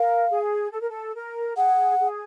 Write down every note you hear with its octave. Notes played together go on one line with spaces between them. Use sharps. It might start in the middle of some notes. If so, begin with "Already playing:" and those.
Already playing: A#4 F5
G#4
A4
A#4
A4
A#4
G#4 F#5
G#4